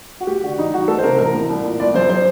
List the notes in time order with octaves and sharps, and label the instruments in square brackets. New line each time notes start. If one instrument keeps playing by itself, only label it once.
[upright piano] F#4
A3 G4
D3 F#4
A1 D#4
G2 F#4
A3 A4
C5
C3 A#4
A1 A#4
A2
C2
A#2
G1 D5
F#2 C5
C5